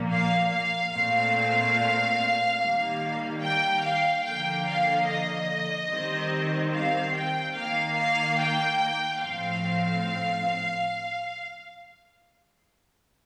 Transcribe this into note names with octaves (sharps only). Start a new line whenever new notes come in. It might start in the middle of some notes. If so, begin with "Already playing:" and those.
Already playing: A#2 F3 A#3
F5
F5
A#2 A3 C4 F5
D#3 G3 A#3
G5
F5
D3 F3 A#3 G5
F5
D#5
D#3 G3 C4
F5
G5
D#3 A#3 F5
F5
G5
A2 F3 C4 F5